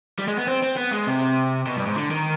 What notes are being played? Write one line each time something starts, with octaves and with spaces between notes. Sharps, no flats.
G3
G#3
B3
C4
C4
B3
G#3
C3
B2
G2
G#2
D3
D#3